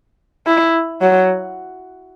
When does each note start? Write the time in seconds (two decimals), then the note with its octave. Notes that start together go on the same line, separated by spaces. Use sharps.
0.47 E4
1.01 F#3